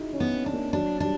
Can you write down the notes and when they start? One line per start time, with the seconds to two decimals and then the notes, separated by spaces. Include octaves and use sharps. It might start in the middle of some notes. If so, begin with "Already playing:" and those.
Already playing: D#4 E4 F#4 G#4
0.13 C#4
0.20 B3
0.34 C4
0.46 D4
0.53 A#3
0.73 F#3 D4
1.00 G3 D4